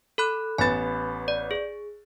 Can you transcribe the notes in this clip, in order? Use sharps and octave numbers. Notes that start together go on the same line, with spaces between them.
A4 B5 F#6
A1 B3 G#5 B5 A6
D5
G#4